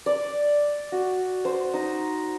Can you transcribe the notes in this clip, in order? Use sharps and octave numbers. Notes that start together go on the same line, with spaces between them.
D5
F#4
C5
D#4